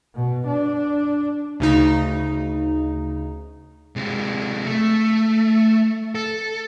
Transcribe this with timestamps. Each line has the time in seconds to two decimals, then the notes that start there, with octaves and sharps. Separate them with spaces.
0.15 B2
0.47 D4
1.60 D2 C#3 D#4
3.96 C3 G#3
4.65 A3
6.15 A4